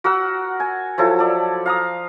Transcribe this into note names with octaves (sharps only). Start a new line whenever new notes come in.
F#4 A#4 F#5 E6
G#5
F3 F#3 E4 A4
A4 D5
F5 A#5 D#6